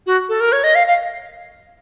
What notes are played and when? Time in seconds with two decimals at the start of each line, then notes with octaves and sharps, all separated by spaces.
0.06 F#4
0.29 A4
0.40 A#4
0.52 C#5
0.64 D#5
0.75 F5
0.87 F5